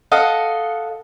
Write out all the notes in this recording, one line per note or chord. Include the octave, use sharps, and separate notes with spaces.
A4 D#5 F5 F#5